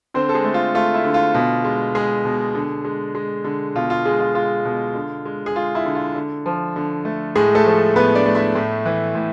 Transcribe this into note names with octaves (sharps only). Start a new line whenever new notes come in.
D3 C4 C5
A4
G#3 G#4
A3
F4
A3 F4
E4
D3
F4
B2
G#3
G#3 G#4
B2
D3
G#3
G#3
D3
B2 F4
F4
G#3 G#4
F4
G#3 F4
B2
D3
G#3
G#4
G#3 F4
E4
D3
F4
D3
F3
D3
A3
A2 G#3 G#4
A3 A4
F3
A2 B3 B4
D4 D5
A3
E4 E5
A2
E3
A2